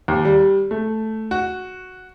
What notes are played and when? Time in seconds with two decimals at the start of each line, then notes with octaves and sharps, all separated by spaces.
0.08 D#2
0.25 G3
0.71 A3
1.31 F#4